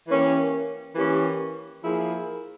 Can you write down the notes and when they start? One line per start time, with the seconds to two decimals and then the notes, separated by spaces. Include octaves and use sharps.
0.08 E3 A#3 C#4 G4
0.95 E3 A#3 C#4 G4
1.83 F3 A#3 E4 G#4